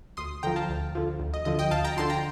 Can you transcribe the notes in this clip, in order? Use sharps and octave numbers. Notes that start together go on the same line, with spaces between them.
D2 C6 D#6
D3 F3 G5 A#5
F5 A5
D2
D3 F3
D2
D#5
D3 F3 D#5
D#5 G5
D2 F5 A5
G5 A#5
D3 F3 A5 C6
G5 A#5